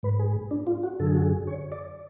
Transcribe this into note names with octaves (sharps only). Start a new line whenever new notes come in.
G#2 B4
G#4
D4
F4
F#4
F#2 D3 A4
G#4
F#4
G#4
C#5
D5